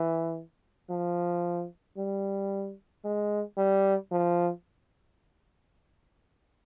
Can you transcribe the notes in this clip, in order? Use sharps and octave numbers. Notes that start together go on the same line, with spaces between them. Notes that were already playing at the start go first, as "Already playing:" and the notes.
Already playing: E3
F3
G3
G#3
G3
F3